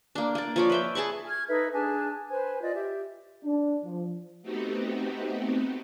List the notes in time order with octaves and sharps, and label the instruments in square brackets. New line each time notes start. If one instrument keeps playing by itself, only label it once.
[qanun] A#3 D4
A#3 D5
F3 C#5 D5
B4 E5 G5
G#4 A5 B5 C#6
[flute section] C#6 F6 G#6
D#4 A4 B4 E5
D4 G#4 G#5 A5
B4 C5 G#5
F4 D5 D#5
G4 E5
[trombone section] D4
F3
[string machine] A3 B3 C4 D#4 F#4 G4